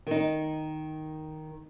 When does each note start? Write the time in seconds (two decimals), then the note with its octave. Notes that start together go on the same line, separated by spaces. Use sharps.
0.07 D#3 D#4